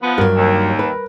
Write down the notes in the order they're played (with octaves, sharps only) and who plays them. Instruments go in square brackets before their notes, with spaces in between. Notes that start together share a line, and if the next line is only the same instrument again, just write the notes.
[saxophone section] F3 B3
[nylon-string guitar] G2 F#3 [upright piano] A#4
[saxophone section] D#2
[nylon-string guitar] B4